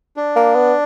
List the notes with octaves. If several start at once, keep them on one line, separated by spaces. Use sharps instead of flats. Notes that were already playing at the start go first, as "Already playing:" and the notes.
D4
A#3
B3